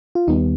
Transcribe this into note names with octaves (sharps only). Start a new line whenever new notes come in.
F4
D#2 D#3 G3 B3 D#4